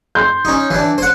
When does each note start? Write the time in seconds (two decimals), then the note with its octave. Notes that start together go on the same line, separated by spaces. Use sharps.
0.15 C6 G6
0.45 C#4 D#4
0.71 E3 D4
0.98 C5 F#5